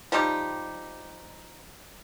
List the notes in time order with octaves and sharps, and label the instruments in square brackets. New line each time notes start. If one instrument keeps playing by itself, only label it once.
[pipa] F3 G3 D#4 G4